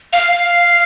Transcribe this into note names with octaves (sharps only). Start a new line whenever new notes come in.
F5